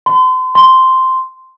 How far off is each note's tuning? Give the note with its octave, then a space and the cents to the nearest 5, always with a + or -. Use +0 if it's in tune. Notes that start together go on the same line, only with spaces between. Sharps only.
C6 -35
C6 -5